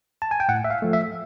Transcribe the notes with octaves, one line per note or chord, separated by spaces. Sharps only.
A5
G#5
G5
A2 F#5
E5
F5
F3 A3
E5